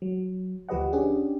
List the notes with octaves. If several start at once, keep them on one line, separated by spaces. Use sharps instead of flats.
F#3
D2 F3 G4 B4 D#5 F#5
C#4 D4 G4 G#4